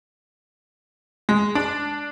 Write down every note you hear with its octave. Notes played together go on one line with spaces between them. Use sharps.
G#3
D4